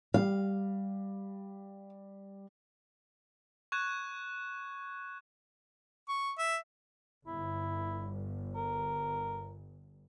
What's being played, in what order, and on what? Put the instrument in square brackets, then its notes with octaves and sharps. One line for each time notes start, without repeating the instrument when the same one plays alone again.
[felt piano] G3 [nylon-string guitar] F5
[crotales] C#6 F#6 G#6 E7
[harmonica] C#6
E5
[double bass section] G1 [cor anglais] E4
[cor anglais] A#4